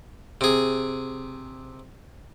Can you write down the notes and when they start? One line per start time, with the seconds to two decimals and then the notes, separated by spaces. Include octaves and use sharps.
0.41 C3 G#4